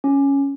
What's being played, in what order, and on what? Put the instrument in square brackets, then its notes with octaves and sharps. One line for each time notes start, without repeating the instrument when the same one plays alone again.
[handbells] C#4